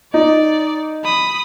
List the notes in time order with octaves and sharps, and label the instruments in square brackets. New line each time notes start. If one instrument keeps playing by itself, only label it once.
[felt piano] D#4 [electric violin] D5
[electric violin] B5 D#6